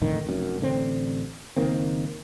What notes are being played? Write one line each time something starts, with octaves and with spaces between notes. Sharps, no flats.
F2 A2 D3 D#3
F1 F#2
A1 D3 C4
F#1 D#3 A#3 C4